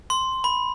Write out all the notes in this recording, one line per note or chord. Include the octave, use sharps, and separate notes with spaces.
C6
B5